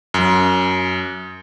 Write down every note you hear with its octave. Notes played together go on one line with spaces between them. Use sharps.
F#2